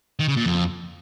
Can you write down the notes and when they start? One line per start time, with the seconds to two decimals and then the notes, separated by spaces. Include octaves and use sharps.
0.20 D#3
0.28 C#3
0.37 A#2
0.45 F2